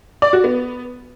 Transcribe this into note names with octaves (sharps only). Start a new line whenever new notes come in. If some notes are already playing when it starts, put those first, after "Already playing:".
D5
F#4
B3